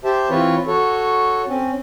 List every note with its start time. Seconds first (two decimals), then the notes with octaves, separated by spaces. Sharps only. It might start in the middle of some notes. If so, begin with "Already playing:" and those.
0.04 G4 C5 E5 A5
0.30 E3 C4 F4 B4 C#5
0.67 F#4 A4 C#5
1.48 C4 C#4